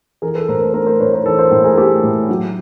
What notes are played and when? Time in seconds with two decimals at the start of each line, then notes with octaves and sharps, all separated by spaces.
0.22 E3 G#4 A#4
0.35 A4 B4
0.48 A2 A#4 C5
0.61 A4 B4
0.73 A3 A#4 C5
0.86 A#4 C5
1.00 A2 B4 C#5
1.13 A#4 C5
1.26 E3 A4 B4
1.39 A#4 C5
1.51 A2
1.64 G#4 A#4
1.77 A3 G4 A4
2.03 A2
2.29 F#3